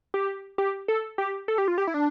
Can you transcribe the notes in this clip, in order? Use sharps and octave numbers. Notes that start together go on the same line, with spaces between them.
G4
G4
A4
G4
A4
G4
F4
G4
E4
D4